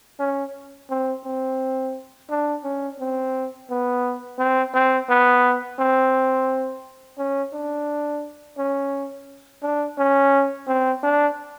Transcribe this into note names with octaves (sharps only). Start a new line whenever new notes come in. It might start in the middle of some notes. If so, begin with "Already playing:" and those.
C#4
C4
C4
D4
C#4
C4
B3
C4
C4
B3
C4
C#4
D4
C#4
D4
C#4
C4
D4